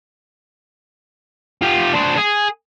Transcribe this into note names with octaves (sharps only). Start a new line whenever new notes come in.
F4 G4
D4 C5
G#4